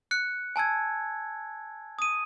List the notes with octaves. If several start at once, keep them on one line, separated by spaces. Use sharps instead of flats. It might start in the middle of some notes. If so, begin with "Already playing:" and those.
F#6 C#7
G#5 A5 E6 G#6
D#6 D#7